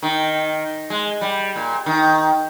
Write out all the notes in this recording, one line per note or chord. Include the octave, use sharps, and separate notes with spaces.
D#3
G#3
G3
A#2
D#3